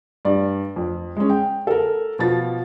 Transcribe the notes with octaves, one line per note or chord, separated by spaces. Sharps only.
G2 D5
F2
G#3 C#4
G5
A4 A#4
B2 F3 A6